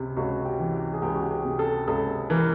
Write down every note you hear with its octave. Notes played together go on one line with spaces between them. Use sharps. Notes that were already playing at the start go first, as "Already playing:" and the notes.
Already playing: C#2 C3
C#2 F#4
G4
E3
G4
G#4
C#2 G4
F#4
G4
G#4
C3
A4
C#2 A4
E3 A#4